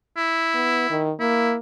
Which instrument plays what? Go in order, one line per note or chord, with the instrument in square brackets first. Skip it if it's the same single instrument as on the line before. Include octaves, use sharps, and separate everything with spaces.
[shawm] E4
[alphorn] B3
D#3
[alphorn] A#3 [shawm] E4